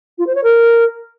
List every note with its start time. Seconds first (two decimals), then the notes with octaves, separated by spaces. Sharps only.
0.18 F4
0.27 C5
0.35 C#5
0.43 A#4